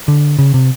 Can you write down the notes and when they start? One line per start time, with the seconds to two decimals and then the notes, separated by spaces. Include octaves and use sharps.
0.08 D3
0.39 C#3
0.54 C3